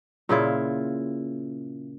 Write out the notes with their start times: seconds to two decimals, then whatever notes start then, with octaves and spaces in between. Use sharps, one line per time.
0.29 A#2 C#3 E4 F4